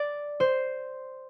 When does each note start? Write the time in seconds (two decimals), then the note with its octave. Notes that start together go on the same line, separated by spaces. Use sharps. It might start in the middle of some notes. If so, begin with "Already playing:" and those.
Already playing: D5
0.40 C5